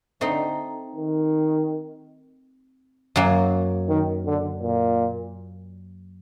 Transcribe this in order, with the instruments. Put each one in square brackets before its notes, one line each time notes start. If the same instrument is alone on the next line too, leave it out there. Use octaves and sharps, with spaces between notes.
[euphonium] D3 [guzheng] A3 C4 D#4
[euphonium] D#3
[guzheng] F#2 F#3 A#3
[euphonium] D#3
D3
A#2